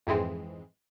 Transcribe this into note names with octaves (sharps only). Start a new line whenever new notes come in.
F2 G#2 E3 G#3 C4